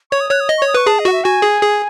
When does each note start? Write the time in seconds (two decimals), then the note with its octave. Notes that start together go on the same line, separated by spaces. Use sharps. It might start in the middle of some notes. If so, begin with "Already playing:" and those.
0.11 C#5 C#6
0.20 D#6
0.30 C#5 F#6
0.40 D#6
0.49 D#5
0.58 C#5 C#6
0.67 D#6
0.74 B4 C#6
0.87 G#4 A5
0.99 D#5
1.05 F#4 F#5
1.12 E5
1.24 F#4 G#5
1.42 G#4
1.62 G#4